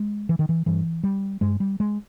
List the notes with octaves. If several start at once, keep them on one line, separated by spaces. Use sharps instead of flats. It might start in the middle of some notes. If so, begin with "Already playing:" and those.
Already playing: G#3
E3
D#3
E3
G2 E3
G3
G2 G#3
G3
G#3